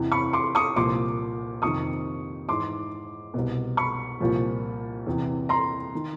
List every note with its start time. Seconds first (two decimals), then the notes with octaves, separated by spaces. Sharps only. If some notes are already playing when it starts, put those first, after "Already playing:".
Already playing: E2 C3 E3
0.12 B5 C#6
0.33 C6 D6
0.55 C#6 D#6
0.76 C2 A#2 F3 C6 D6
1.62 F2 C3 D#3 C#6 D#6
2.49 G#2 E3 C6 D6
3.34 C2 B2
3.77 B5 C#6
4.20 C2 A#2 F3
5.07 E2 C3 E3
5.49 A#5 C6
5.95 D#3